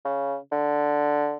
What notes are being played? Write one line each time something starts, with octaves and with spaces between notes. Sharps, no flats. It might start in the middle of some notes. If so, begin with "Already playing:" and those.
C#3
D3